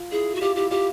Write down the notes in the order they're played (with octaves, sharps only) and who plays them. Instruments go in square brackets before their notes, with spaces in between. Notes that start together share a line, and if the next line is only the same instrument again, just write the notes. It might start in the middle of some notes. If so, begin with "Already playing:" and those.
Already playing: [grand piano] F4
[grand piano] E4 [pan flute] G#4
[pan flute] F#4
[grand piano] F4 [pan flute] G4
[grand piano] E4 [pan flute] G4
[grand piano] F4 [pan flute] G4